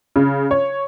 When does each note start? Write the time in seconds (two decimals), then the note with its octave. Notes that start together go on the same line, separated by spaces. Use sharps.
0.16 C#3
0.51 C#5